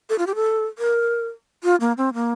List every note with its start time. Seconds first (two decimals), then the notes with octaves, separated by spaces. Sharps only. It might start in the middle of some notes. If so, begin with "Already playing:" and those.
0.10 A4
0.19 F4
0.27 G4
0.35 A4
0.78 A#4
1.64 F4
1.81 A#3
1.97 C4
2.14 A#3